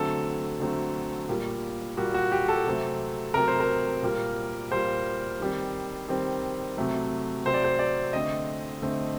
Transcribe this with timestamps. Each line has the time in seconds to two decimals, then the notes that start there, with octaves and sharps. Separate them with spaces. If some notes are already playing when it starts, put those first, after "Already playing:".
Already playing: D3 F#3 A3 C4 A4
0.60 D3 F#3 A3 C4
1.29 A#2 G3 A#3
1.97 A#2 G3 A#3 F#4
2.14 F#4
2.32 G4
2.48 A4
2.66 C3 F#3 A3 C4
3.34 C3 F#3 A3 C4 A#4
3.48 C5
3.60 A#4
4.03 A#2 G3 A#3
4.71 A#2 G3 A#3 C5
5.40 D#3 G3 C4
6.08 D#3 G3 C4
6.77 C3 F#3 A3 C4
7.46 C3 F#3 A3 C4 C5
7.54 D5
7.64 C5
7.79 D5
8.13 D3 A3 C4 D#5
8.82 D3 A3 C4